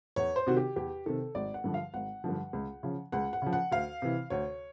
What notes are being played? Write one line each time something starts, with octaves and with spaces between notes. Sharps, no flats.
E2 C#5
C5
C3 D#3 F#4
G4
E2 G4
C3 D#3 A4
G#1 D5
F#5
G2 D3 F3
F5
G#1 F#5
G2 D3 F3
C#2
C#3 F3
C#2 F#5
F#5
C#3 F3
F#5
D2 F5
C3 E3
D2 C#5